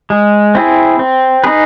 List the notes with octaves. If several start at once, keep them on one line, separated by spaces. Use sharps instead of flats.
G#3
C4 E4 G#4
C4
D#4 G#4 B4